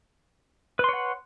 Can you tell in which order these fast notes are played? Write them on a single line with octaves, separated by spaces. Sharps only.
B4 C6 C#5 F#5